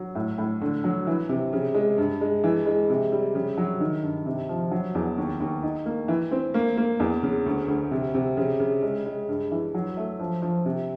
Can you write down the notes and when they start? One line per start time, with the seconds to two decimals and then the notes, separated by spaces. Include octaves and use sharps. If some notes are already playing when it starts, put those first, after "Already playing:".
Already playing: F#3
0.15 A2
0.38 A2
0.61 D3
0.84 F#3
1.07 E3
1.29 C3
1.53 C#3
1.75 G#3
1.98 G2
2.21 G#3
2.44 E3
2.66 G#3
2.90 C3
3.12 G3
3.35 C#3
3.57 F#3
3.80 D#3
4.03 G2
4.26 C3
4.49 F3
4.71 F#3
4.95 E2
5.18 D#2
5.40 D#2
5.63 D#4
5.86 A#3
6.08 E3
6.31 C4
6.54 A#3
6.77 A#3
7.00 E2
7.23 C#3
7.46 D2
7.68 D2
7.91 C3
8.14 C3
8.37 C#3
8.60 C#3
8.83 G#3
9.06 G#3
9.29 G2
9.51 E3
9.75 F#3
9.97 A3
10.19 F3
10.42 F3
10.65 C3